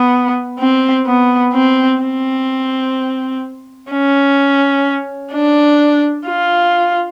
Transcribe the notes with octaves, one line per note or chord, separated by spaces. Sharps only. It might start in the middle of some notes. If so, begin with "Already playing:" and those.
Already playing: B3
C4
B3
C4
C4
C#4
D4
F4